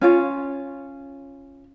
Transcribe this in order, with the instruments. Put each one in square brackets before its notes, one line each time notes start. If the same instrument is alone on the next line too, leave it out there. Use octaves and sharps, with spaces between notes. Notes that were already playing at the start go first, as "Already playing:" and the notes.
[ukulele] C#4 F4 C#5